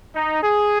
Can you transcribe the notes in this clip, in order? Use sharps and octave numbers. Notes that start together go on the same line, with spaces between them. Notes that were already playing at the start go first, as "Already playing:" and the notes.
D#4
G#4